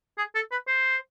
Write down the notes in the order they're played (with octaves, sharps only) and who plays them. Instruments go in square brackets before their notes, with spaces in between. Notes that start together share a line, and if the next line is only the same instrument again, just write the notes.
[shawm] G#4
A4
B4
C5